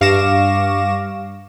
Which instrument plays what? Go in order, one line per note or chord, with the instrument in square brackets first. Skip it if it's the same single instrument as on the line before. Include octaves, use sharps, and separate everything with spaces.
[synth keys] G2 F5 C#6 D6 A#6 E7